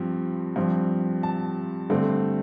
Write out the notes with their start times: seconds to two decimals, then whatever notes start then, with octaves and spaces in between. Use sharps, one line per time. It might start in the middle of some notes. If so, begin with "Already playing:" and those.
Already playing: G2 F3 C4
0.56 G2 F3 C4
1.23 A5
1.90 G2 D3 A3 C4